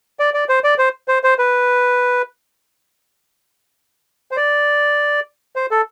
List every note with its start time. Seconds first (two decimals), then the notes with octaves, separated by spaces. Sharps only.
0.19 D5
0.34 D5
0.49 C5
0.64 D5
0.78 C5
1.08 C5
1.24 C5
1.39 B4
4.31 C5
4.37 D5
5.56 C5
5.71 A4